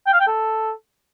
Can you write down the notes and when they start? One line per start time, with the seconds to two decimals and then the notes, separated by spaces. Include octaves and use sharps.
0.06 G5
0.13 F5
0.20 G5
0.27 A4